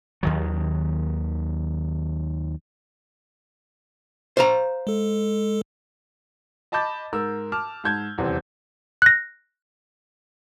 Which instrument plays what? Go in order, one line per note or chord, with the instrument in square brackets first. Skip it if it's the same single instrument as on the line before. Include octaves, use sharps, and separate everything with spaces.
[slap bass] D#2 D#3 F#3
[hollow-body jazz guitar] C5 F5 A#5
[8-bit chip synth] G#3 A4
[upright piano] D#5 A5 B5 D6 G6 A6
G#2 A#4 E6
A5 D6 F6
G#2 A5 G6 G#6
D#1 E2 C3 C4
[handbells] F#6 A#6